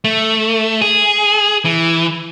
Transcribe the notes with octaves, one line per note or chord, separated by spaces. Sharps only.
A3
G#4
E3